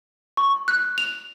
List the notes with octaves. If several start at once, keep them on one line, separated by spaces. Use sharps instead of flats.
C#6
F#6
F7